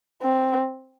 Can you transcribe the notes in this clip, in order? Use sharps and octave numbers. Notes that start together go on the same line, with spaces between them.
C4